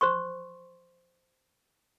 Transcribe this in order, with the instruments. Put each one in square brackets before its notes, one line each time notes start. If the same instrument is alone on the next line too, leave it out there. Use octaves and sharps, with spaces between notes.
[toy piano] C5 C6 C#6